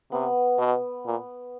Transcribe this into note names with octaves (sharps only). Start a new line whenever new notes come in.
C3 B3
B2
A#2